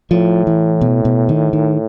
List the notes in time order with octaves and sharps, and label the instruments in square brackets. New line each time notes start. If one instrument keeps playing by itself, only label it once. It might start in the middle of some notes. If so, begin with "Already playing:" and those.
[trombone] A2 [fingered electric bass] F3
[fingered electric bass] E3
B2
B2
D#3
D#3